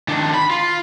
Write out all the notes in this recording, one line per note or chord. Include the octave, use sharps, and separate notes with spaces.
D#3 D4
B5
F4